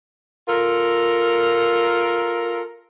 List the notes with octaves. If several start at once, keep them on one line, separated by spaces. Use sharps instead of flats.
F4 A4 A#4